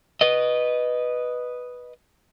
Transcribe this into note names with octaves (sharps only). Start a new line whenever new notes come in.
B4 D#5